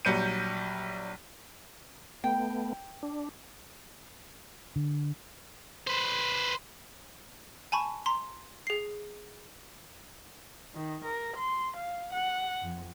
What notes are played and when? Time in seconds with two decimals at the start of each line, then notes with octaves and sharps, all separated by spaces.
0.05 A#1 F#3 G3 G6 C#7 D#7
2.24 A3 B3 G5
3.03 D4
4.76 D3
5.87 B4 C5
7.72 G#5 A5 B5 C#6
8.06 A#5 C6
8.67 G#4 C7
10.75 D#3
11.05 A#4
11.37 C6
11.76 F5
12.13 F#5
12.62 F2